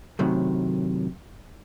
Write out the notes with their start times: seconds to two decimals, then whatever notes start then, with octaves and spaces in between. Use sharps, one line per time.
0.19 F#2 A2 C3 D#3 F#3